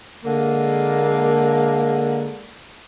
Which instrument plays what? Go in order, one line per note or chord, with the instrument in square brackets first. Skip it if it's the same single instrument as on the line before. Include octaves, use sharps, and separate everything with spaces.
[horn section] D3 G#3 A#3